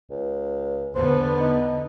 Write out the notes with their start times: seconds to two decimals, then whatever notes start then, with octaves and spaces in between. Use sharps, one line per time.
0.10 C#2
0.95 E2 D3 B3 C5
1.40 D#4